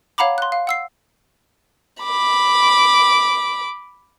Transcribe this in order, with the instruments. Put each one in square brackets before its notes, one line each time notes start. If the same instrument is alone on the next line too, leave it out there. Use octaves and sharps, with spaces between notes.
[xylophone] C#5 F5 F#5 A#5 B5 D6
C6 F#6
F5
F#5 E6 C7
[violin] B5 D6